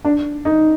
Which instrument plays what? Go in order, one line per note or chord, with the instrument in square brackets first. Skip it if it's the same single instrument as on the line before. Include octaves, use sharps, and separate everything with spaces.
[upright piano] D4
D#4